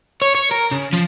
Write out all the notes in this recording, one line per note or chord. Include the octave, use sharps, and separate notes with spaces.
C#5
C#5
A#4
C#3
F3